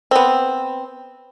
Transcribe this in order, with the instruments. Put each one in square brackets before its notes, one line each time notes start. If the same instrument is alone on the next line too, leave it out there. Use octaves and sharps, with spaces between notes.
[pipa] B3 C4